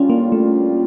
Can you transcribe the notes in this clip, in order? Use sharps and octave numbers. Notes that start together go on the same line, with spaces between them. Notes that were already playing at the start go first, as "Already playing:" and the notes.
Already playing: A2 G3 C#4 D4 F4
A#3
A3